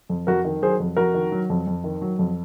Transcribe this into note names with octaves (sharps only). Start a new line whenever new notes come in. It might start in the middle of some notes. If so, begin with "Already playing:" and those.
F2
F2 F#4 A#4
D#3
F#3 G#4 C5
F2
F2 F#4 A#4
D#3
F#3
F2
F2
D#3
F#3
F2